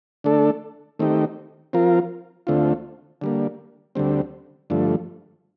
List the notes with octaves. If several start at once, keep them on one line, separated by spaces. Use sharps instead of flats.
D3 A3 D4 A4
D#3 A3 C4 D#4 G4
F3 C4 F4 A#4
D2 D3 A3 C4 F4
D3 G3 A#3
D2 D3 G3 C4
G2 D3 F3 A3